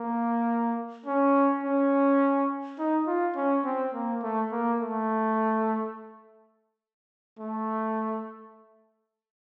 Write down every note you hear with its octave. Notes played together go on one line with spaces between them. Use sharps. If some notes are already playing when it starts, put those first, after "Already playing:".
Already playing: A#3
C#4
C#4
D#4
F4
C#4
C4
A#3
A3
A#3
A3
A3